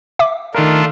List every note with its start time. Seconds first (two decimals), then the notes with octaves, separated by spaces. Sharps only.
0.19 E5 D6
0.55 D#3 A3 D4 F4 A#4